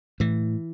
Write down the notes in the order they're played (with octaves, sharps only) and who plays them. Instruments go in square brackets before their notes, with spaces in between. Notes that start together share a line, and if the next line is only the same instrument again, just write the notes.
[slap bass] A2 E3